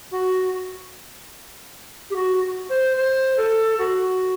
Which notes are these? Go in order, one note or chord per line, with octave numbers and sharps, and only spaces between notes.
F#4
G4
F#4
C5
C5
A4
F#4